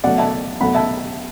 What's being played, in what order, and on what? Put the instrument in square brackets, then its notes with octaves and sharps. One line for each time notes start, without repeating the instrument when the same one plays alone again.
[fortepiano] B2 F#3 A3 D5 F#5
E5 A5
B2 F#3 A3 F#5 B5
E5 A5